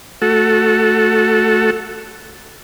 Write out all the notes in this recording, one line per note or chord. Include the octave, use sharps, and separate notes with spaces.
A3 F#4 A4